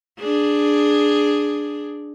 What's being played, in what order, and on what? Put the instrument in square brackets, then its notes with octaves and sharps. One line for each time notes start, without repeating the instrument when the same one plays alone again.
[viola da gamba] D4 G#4